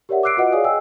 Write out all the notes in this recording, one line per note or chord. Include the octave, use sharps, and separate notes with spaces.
G4 A#4 C#5 D5 E5 F#5
D6 E6 F#6 C7 D7
F4 F#4 B4 D#5 F#5
G#4 C#5 D5 F5 G#5 D#6
D#5 G5 G#5 E6